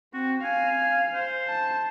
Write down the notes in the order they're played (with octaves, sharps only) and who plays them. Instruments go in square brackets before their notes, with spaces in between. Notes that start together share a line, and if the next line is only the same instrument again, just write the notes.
[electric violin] C4 [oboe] F#4
[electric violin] F5 [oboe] G#5
[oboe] C5
[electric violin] A5